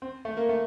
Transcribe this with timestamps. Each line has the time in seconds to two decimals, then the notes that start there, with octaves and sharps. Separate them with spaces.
0.02 C4
0.25 A3
0.37 A#3
0.49 A3